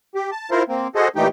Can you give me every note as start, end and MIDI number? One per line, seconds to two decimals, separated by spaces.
0.15 0.31 67
0.31 0.50 81
0.51 0.63 64
0.51 0.63 65
0.51 0.63 70
0.51 0.63 72
0.69 0.88 58
0.69 0.88 60
0.95 1.08 66
0.95 1.08 68
0.95 1.08 69
0.95 1.08 72
0.95 1.08 75
1.16 1.28 46
1.16 1.28 52
1.16 1.28 57
1.16 1.28 63
1.16 1.28 67
1.16 1.28 79